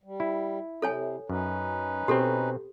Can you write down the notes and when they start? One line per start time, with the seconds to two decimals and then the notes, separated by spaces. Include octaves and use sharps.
0.04 G3
0.20 E4
0.82 C3 A4 C#5 G#5
1.30 F#2 C#4 D#4 B4
2.08 B2 C4 G4 A4